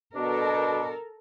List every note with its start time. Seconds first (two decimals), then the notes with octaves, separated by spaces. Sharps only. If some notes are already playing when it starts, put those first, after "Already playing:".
0.15 B2 D4 A4 A#4